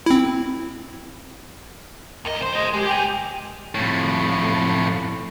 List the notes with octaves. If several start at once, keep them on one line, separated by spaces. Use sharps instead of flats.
C4 E4
D#2 A#4 D#5
C5 C6
F4 G#4 D#5
G#3 G4
G4 G5 G#5
G5
F2 A2